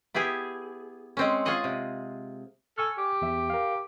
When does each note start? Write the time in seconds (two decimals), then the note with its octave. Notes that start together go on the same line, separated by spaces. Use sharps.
0.15 B3 E4 G4 G#4
1.17 G#3 C4 C#4
1.45 F4 G#4 C#5 D#5 F#5
1.64 C3
2.78 A4 G#5 C#6 F6
2.97 G4
3.22 E2 E5
3.50 A#4 F5